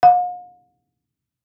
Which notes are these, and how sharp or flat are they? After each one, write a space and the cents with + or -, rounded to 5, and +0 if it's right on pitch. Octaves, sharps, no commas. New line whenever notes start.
F5 +45